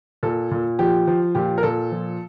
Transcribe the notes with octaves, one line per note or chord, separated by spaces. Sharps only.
A#2 A4
A#2
F3 G4
F3
A#2 G4
A#4
A#2 A4
F3